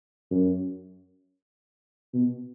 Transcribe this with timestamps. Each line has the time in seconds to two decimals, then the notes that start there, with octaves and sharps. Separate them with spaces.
0.31 F#2
2.13 B2